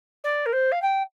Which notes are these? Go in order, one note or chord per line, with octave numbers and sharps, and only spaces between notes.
D5
A#4
C5
F5
G5